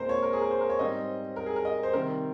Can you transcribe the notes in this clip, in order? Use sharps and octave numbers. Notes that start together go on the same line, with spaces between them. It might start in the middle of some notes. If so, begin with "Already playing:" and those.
Already playing: A#2 G#3 C4 A#4 C5
C#5
A#4
G#4
A#4
C5
A#4
C#5
G#2 G3 C4 D#5
A#4
G#4
A#4
D#5
C5
C3 D#3 G3 C4 A#4